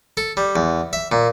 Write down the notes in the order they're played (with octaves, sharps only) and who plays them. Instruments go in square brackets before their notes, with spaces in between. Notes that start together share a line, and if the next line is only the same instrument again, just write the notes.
[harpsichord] A4
G3
E2
E5
A#2